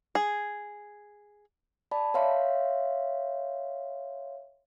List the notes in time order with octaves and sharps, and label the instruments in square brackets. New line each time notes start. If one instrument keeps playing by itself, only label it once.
[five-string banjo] G#4
[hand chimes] D5 A5 B5
C#5 E5 F5 C6